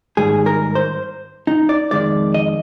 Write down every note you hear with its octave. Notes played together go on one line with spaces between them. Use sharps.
G#2 D#3 G3 G#4
A#4
C5
D#4
D5
F2 D#3 G#3 D5
D#5